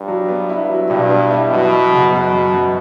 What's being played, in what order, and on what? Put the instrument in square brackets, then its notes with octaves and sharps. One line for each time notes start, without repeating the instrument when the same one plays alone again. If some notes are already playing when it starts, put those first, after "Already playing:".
Already playing: [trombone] G2
[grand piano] F#3
B3
E4
F#3
[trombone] G2 [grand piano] B2
[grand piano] B3
E4
[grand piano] F#2 [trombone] B2
[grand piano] F#2
C#3
[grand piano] F#2 [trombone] B2
[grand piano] F#2
F#2